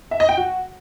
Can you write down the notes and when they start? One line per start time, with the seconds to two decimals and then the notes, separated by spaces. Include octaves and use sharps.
0.11 E5
0.20 D#5
0.29 G5
0.37 F#4